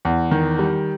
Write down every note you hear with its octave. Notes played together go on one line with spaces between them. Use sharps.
E2
D#3
G3